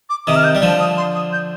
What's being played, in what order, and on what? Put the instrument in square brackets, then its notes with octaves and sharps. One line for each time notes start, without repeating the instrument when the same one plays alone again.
[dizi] D6
[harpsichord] C3 D#3 [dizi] D#6
[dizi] F6
G6
[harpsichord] G3
D3 F3
[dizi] D#6
C6
D#6
G6